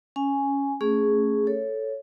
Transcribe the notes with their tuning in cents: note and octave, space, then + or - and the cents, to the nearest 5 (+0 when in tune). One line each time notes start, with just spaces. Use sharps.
C#4 +0 G#5 +0
A3 +15 C#4 +0 G#4 +0
A4 +0 C#5 +0